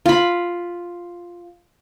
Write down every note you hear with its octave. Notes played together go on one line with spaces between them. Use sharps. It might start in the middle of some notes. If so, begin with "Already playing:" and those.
F4 B5